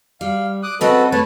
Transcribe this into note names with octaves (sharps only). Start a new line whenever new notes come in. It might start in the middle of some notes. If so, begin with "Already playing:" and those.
G3 F5
D6 D#6 F#6
C#3 C4 F#4 A4 B4 D#5
A3 B4 C#5 A5